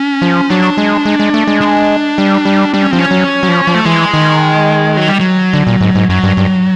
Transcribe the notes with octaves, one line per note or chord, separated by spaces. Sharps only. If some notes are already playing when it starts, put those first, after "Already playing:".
Already playing: C#4
F3
F#3 D4
G#3
G#3
G#3
A3
G#3
D4
G3
G3
G3 D4
C#4
F3 C4
C#4
F#3
F#3
F3
F3
A3
E3 G#3
D#3
F#3
G3
F#3
D3
A#2
G#2
G#2
F#2 F#3
G2
G2